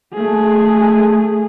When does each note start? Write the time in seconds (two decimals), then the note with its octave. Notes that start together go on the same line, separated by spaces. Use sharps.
0.14 A3 G#4